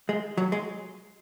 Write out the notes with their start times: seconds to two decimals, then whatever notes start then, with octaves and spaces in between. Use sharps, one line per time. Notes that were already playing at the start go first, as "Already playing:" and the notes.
0.09 G#3
0.38 F#3
0.52 G#3